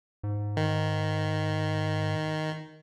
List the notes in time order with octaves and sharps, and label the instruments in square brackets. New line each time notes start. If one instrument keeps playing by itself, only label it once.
[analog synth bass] G#2
[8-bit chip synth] D#3